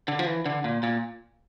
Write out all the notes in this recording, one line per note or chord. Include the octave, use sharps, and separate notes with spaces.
D3
F3
E3
D3
A#2
A#2